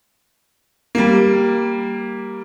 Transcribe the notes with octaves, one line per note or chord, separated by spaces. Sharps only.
G3 A#3